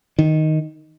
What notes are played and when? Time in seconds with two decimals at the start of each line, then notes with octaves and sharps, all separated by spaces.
0.19 D#3